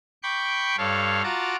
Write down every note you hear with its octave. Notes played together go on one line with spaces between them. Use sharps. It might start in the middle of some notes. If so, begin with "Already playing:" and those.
G5 B5 C#6 D6 G6
G2 A4 C#5 F5
F4 F#4 A5 A#5 D6